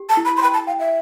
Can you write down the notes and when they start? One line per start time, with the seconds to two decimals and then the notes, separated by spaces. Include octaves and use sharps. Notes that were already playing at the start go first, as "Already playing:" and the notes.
Already playing: G4
0.09 A5
0.17 E4
0.25 B5
0.37 C6
0.42 G5 B5
0.54 A5
0.67 F5 G5
0.79 E5